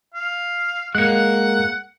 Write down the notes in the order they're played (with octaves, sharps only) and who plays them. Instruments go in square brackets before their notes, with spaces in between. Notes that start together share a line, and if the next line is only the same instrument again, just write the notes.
[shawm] F5
[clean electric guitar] G#3 A#3 [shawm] F#5 [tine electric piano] F#6 C#7